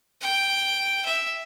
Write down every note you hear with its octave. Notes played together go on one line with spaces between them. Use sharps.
G5
E5